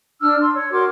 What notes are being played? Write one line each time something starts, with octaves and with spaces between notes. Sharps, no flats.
D4 E6 F6
C6
C#5
F#4 A#4 C6 D6